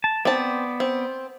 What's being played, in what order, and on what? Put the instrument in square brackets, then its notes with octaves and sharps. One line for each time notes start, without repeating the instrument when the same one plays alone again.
[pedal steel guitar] A5
[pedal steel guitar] B3 D5 [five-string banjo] C4 A5
[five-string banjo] C4